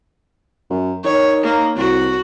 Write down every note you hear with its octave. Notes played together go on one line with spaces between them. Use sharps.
F#2
D#3 C#5
A#3
C2 F#4